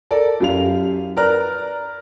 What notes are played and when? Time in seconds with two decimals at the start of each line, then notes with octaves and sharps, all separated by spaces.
0.11 A4 A#4 D5
0.40 F#2 E4 G4 F5 F7
1.17 A#4 B4 D5 A#5 F6 F#6